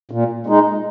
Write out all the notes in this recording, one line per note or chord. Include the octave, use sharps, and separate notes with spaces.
A#2
G#3 D#4